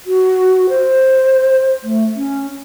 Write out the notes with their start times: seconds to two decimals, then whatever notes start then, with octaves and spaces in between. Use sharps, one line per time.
0.06 F#4
0.69 C5
1.83 A3
2.16 C#4